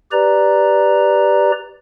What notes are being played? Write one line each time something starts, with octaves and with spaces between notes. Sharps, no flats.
G4 B4 D5 A#5